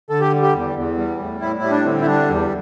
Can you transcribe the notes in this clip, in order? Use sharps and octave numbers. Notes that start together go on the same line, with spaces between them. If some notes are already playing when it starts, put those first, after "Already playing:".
D3 A4
G4
G3
G4
E2
E2
G3
A2
A2 E4
E4
G3
D4
D3 C4
E4
G3 D4
E2